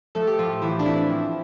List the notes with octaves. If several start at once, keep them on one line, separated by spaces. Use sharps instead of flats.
F3 A3 A4
G4
A2 F3 F4
A2 E3 E4
D4
E3 C4 E4
F3